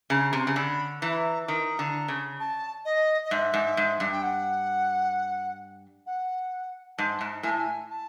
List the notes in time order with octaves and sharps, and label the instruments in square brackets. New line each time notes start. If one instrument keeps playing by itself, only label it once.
[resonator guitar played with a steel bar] C#3 [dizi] A#5
[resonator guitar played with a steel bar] C3
[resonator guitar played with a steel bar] C#3 [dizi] A#5
[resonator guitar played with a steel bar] D3 [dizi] B5
[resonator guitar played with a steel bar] E3 [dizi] A#5
[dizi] B5
A#5
[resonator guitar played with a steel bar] D#3 [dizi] A#5
[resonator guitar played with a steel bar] D3
C#3
[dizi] A5
D#5
D#5
[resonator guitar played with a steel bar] G#2 [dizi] E5
[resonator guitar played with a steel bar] G#2
G#2
G2
[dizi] G5
F#5
F#5
[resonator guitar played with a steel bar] G#2 [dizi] A5
[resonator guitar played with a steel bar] G#2
[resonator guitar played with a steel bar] A2 [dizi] G#5
[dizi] A5
G#5
A5